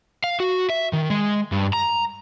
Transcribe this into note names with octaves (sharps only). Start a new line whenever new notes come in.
F5
F#4
E5
D#3
G#3
G2
A#5